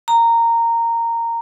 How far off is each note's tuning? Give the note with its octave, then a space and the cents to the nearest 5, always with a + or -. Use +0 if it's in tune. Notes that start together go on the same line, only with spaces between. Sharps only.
A#5 -15